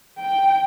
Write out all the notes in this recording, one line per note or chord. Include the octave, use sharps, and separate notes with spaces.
G5